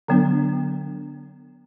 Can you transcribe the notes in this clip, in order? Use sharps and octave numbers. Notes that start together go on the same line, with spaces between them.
D3 F#3 B3 D4